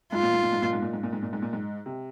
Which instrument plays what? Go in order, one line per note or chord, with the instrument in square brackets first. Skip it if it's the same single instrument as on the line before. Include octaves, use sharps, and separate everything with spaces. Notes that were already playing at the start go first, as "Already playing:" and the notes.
[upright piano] G#2 [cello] F4
[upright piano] A#2
G#2
A#2
G#2
A#2
G#2
A#2
G#2
A#2
G#2
A#2
G#2
A#2
G#2
C3